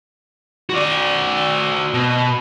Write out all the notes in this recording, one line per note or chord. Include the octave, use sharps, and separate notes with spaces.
F#4 D5
B2